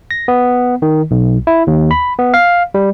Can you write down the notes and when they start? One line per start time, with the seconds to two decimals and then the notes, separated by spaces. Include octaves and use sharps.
0.11 A#6
0.28 B3
0.82 D#3
1.11 B1
1.47 E4
1.67 D#2
1.91 B5
2.19 B3
2.34 F5
2.74 G3